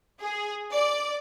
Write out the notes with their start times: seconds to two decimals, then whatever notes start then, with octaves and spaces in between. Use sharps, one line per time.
0.21 G#4
0.72 D5